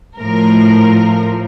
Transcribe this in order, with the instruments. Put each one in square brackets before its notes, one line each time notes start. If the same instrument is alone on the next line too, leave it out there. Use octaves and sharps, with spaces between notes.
[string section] A2 F3 A#4